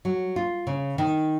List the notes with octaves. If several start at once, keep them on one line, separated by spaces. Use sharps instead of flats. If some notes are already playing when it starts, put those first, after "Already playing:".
F#3
F4
C#3
D#3